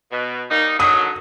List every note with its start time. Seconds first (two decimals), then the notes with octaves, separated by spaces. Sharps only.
0.12 B2
0.51 G3 A#3 D#4
0.80 D3 D#3 F#3 D#6